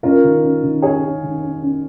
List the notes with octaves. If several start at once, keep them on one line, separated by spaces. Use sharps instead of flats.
C#4 F4 A#4
D#3
C#4
D#3
C#4 G#4 C#5
C#4
D#3
C#4
C#4